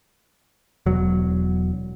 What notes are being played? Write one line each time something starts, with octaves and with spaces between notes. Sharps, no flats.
E1 F#3